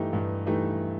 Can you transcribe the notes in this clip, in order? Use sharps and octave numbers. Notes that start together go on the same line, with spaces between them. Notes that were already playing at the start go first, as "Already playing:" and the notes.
Already playing: G2 E3 A3 D#4 G4
G2
E3 A3 D#4 G4